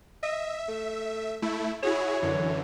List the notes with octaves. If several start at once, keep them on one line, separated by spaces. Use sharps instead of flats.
D#5 E5
A3
A3 E4
E4 F#4 G#4 C#5
F#2 D3 E3